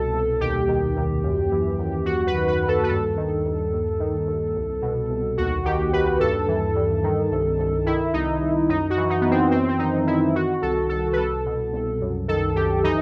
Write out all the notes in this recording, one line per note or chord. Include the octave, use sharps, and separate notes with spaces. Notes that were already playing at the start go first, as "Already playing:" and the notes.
Already playing: C2 B2 A4
C2
D#2 G4
D#3
D#2
F#2
E3
F#2
D#2 F#4
B4
D#3
B4
D#2
A4
B4
G2 A4
D#3
G2
D#2
D#3
D#2
C2
B2
C2
D#2 F#4
D#3 G4
D#2 B4
G2 A4
E3
G2
D#3
C2
C2
D#3 E4
C2 D#4
C2
F#2 D#4
F#4
E3
D#4
F#2 B3
C4
F#2 C4
C4
D#3 D#4
F#2 E4
D#3 F#4
C2 A4
C2 A4
B4
C2 A4
B2
C2
F#2
D#3 A4
F#2 G4
E3 D#4